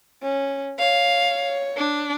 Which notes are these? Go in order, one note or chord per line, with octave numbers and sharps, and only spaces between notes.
C#4
C#5 F5
D4